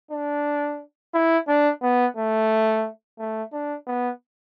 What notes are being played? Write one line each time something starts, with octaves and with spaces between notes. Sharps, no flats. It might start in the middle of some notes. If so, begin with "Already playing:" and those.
D4
E4
D4
B3
A3
A3
D4
B3